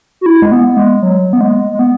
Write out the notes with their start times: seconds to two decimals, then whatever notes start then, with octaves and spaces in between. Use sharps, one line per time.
0.21 F#4
0.26 E4
0.42 G#3
0.52 B3
0.77 G#3
1.03 F#3
1.33 B3
1.41 G#3
1.72 G#3
1.79 B3